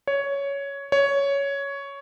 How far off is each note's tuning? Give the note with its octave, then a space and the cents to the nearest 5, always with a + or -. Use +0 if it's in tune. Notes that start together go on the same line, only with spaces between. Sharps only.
C#5 +10
C#5 +10